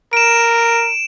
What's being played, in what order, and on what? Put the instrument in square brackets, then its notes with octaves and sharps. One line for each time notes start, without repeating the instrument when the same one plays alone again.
[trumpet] A#4 [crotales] D7 E7